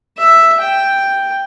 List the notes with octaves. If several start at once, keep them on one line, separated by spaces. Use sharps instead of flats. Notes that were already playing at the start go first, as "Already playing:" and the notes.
E5
G5